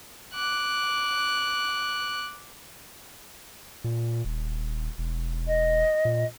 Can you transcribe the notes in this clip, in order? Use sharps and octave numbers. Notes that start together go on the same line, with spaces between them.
D6 F#6
A#2
D#1
E1
D#5
A#2